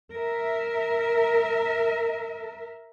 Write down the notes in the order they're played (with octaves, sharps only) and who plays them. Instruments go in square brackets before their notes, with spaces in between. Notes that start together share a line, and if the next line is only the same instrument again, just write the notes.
[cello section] A#4 E5